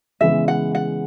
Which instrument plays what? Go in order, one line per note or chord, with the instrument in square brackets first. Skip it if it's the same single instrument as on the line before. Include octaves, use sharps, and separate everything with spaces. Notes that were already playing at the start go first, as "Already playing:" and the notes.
[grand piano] C#3 E3 G#3 B3 [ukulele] E5
[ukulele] F#5
F#5